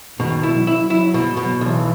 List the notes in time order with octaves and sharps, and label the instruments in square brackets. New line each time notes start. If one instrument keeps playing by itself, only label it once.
[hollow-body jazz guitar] B2 [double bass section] D#3
[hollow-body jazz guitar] E4
[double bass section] F#3
[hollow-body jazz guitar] E4
[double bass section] F#3 [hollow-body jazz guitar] E4
[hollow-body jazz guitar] B2
[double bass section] F#3
[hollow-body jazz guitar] B2
[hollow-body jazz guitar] B1 [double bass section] E3